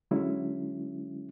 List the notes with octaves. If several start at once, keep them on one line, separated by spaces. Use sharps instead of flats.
D3 F#3 G#3 C#4 E4